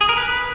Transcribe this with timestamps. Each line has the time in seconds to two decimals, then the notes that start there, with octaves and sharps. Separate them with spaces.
0.01 G#4
0.09 A#4
0.17 B4